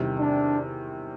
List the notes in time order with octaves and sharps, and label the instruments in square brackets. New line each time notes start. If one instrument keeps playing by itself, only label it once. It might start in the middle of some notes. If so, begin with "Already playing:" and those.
Already playing: [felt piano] E2 C3 D#3 G3
[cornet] D4